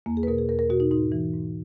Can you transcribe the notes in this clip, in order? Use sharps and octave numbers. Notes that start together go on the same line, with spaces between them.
E2 A#3
G#4
B4
B2 A#4
G#4
E2 A#4
A#4
B2 F#4
D#4
G#2 D#4
E3
G#2